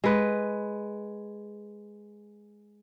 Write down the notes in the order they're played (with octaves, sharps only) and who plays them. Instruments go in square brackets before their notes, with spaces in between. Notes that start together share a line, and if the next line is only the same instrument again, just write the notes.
[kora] G#3 B4